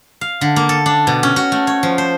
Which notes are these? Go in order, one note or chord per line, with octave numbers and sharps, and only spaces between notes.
F5
D3
A#3
A4
D4
B2
C#4
F#4
A3
C#5
F3
C5